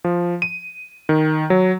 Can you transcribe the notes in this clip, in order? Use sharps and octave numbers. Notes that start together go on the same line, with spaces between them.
F3
D#7
D#3
F#3